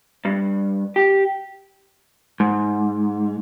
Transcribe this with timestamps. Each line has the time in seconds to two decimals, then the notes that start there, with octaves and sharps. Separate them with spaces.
0.25 G2
0.96 G4
2.40 G#2